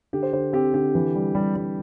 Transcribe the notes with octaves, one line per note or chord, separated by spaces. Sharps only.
D3 G4
C5
D3 C5
C4 G4
D3 G4
E3
G3
G3
G3